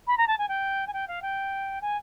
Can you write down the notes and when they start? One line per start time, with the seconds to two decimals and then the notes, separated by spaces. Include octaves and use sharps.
0.07 B5
0.18 A#5
0.27 A5
0.38 G#5
0.48 G5
0.87 G#5
0.93 G5
1.07 F5
1.22 G5
1.81 G#5